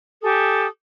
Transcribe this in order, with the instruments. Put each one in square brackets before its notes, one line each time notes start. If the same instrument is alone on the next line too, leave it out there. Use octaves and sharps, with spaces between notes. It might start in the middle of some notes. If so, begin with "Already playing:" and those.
[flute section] G4 A4 G#5 D#6